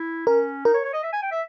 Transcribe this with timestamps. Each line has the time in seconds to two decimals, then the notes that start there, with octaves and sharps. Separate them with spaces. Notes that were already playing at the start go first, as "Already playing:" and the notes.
Already playing: E4
0.27 C#4 A#4
0.65 D#4 A#4
0.74 C#5
0.85 C#5
0.94 D#5
1.03 E5
1.13 G#5
1.22 G5
1.31 E5